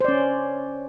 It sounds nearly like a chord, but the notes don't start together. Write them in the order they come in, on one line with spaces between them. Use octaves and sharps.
C5 D5 C#4